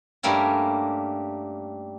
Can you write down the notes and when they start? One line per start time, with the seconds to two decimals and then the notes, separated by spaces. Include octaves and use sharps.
0.23 G2 G3 A3 A#3 C#4